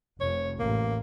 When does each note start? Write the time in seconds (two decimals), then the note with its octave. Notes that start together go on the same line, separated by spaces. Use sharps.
0.21 F1 C#5
0.59 A1 A#3